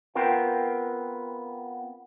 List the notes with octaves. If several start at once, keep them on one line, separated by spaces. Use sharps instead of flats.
B3 C4 F4 A#4 G5